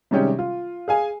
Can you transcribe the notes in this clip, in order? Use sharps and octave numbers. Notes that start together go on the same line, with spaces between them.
C3 D#3 G3 G#3 C#4 G4
F4
G#4 F5 G#5